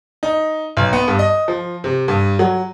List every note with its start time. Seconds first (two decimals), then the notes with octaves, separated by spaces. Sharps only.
0.23 D#4
0.77 B1
0.93 B3
1.08 G2
1.19 D#5
1.48 F3
1.84 C3
2.08 G2
2.39 F#3